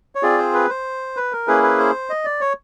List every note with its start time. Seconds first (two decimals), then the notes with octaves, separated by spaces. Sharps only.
0.15 C#5
0.23 C4 F4 G#4 D5
0.38 C5
0.54 B4
0.69 C5
1.17 B4
1.32 A#4
1.47 A#3 C#4 E4 G#4 B4
1.63 B4
1.79 C5
2.10 D#5
2.25 D5
2.41 C#5